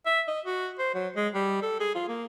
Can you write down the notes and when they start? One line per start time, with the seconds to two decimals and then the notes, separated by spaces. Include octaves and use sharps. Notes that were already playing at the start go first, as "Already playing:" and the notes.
0.06 E5
0.28 D#5
0.45 F#4
0.79 C5
0.95 F#3
1.16 G#3
1.34 G3
1.62 A4
1.80 G#4
1.95 F4
2.08 A#3